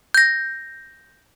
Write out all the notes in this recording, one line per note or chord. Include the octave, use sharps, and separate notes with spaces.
G6 A#6